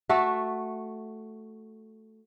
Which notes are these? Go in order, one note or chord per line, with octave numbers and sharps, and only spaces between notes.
A3 F#4 A4 E5